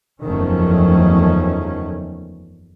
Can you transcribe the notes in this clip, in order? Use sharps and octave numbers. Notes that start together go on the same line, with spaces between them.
F#1 E2 D#3 F3 A3 C#4